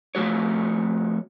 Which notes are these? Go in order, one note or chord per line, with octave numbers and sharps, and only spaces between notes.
F2 C#3 A3 F#4 C#5